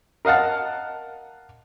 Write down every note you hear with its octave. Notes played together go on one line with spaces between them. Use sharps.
A#4 D#5 F5 F#5 A5